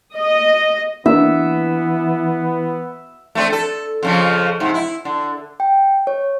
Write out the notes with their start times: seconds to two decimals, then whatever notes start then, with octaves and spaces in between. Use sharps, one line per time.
0.17 D#5
1.06 E3 A#3 B3 D4 E5
3.35 A3 C4 D4
3.52 A4
4.03 F2 C#3 F3
4.60 G#2 C3
4.74 E4
5.05 D3
5.60 G5
6.07 C#5